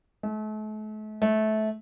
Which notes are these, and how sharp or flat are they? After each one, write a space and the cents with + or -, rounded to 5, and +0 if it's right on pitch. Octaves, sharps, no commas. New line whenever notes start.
A3 -40
A3 -20